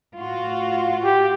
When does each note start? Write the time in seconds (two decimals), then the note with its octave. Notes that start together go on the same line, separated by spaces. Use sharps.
0.16 A2 F4 F#4
1.04 G4